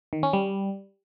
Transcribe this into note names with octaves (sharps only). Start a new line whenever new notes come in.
D#3
C#4
G3